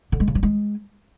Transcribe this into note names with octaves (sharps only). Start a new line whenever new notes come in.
D3
G#3
C#3
F#3
G#3